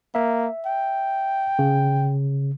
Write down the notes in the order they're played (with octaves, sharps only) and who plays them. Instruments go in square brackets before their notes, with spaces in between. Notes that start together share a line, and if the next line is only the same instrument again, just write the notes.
[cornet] A#3 [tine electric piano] E5
[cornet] G5
[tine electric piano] C#3